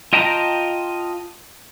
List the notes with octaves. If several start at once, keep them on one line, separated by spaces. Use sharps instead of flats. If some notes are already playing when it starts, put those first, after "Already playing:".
F4 D#5 G5 A5 A#5